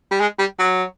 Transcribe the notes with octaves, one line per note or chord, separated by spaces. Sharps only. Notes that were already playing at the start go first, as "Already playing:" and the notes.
G3
G#3
G3
F#3